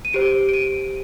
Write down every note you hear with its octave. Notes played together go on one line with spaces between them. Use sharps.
D#7
G4 C5 D7
D7
D#7